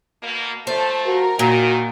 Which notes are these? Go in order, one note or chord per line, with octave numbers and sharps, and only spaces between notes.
B2 A#3
F3 A3 C5 A5
F#4 A#4
A#2 D#3 F#4